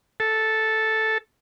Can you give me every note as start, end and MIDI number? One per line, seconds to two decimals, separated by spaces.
0.20 1.18 69